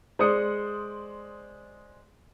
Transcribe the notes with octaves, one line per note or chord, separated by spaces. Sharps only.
G#3 C5 D5 D#6 C#7